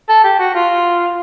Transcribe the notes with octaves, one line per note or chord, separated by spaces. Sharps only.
A4
G4
F#4
F4